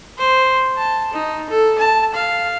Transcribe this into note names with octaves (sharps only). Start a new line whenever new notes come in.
C5
A5
D#4
A4
A5
F5